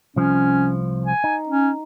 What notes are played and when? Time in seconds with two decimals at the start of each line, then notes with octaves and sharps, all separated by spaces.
0.16 C2 F3 C#4
1.06 G#5
1.24 D#4
1.48 C#4